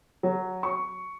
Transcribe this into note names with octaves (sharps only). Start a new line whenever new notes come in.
F#3
C#6